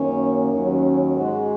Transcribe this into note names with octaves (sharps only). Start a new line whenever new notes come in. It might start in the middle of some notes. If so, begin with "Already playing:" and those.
Already playing: F#2 D#3 A#3 C#4
D#2 D#3 F#3 C#4
G#2 G#3 F#4